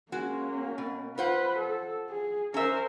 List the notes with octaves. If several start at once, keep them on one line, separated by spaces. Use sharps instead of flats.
G#3 A#3 C#4 F#4
B2
F4 B4 C5 F#5
A4
G#4
C#4 A#4 C5 E5